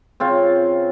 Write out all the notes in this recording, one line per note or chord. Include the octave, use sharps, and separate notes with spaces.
C#3 C4 F4